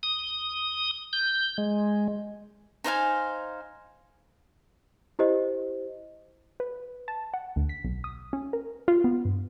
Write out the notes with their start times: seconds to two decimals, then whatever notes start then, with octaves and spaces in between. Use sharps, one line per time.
0.03 D#6
1.13 G6
1.58 G#3
2.84 D#4 C5 F5 G#5
5.19 E4 G4 C5 D#5
6.60 B4
7.08 A5
7.34 F#5
7.56 D2
7.69 B6
7.84 B1
8.04 D#6
8.33 C#4
8.53 A#4
8.88 F4
9.04 B3
9.25 G2